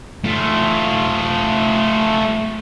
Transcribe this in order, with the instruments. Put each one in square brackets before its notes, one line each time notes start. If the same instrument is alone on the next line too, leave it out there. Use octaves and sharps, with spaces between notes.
[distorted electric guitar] A3 F4